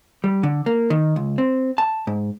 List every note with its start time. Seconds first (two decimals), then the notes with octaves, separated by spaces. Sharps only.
0.24 G3
0.43 D3
0.66 A#3
0.90 D#3
1.16 C#2
1.38 C4
1.78 A5
2.07 G#2